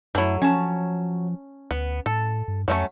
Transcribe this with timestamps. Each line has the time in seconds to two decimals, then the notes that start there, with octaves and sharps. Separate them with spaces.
0.15 F#2 E3 F#3 A3 E4
0.42 F3 C#4 A5
1.71 D2 B3
2.06 A2 A4
2.48 G2
2.68 F2 F#3 A3 C#4